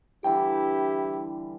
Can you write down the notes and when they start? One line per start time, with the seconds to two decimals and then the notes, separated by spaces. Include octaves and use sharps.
0.24 D3 E3 G3 E4 G4 G5